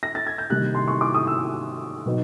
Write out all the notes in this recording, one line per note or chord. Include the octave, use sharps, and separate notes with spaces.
A#6
A6
G#6
G6
C3 D#3 G3 A#3 D#4 F#6
C6
C#6
D6
D#6
E6
B2 F#3 B3 D#4